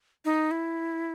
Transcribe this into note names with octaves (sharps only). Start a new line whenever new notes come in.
D#4
E4